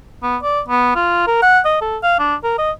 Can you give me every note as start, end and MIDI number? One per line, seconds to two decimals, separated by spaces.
0.23 0.37 59
0.42 0.60 74
0.69 0.91 59
0.96 1.23 65
1.27 1.38 70
1.42 1.60 78
1.65 1.79 75
1.81 1.97 69
2.03 2.16 77
2.19 2.35 62
2.43 2.54 70
2.58 2.71 75